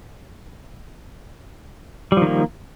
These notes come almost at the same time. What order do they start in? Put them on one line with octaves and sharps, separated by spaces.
G3 F3 D#3 A#3